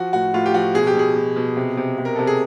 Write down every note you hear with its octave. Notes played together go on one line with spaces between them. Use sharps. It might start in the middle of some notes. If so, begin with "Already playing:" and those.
Already playing: F3 F#4
A2 F#4
A2 F4
G4
F3 F#4
B2 G#4
G4
B2 G#4
B2
B2
C3
C3
C3
A#4
C3 A4
G#4